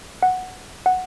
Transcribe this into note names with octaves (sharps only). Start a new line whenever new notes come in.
F#5
F#5